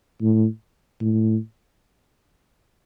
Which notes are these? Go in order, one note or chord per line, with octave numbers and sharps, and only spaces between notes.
A2
A2